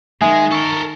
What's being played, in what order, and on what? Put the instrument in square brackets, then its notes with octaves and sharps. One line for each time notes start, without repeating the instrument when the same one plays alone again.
[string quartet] D#3 [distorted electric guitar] G#3 [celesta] E5 G#5 D#6
[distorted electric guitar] A4 A#4 [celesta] C#6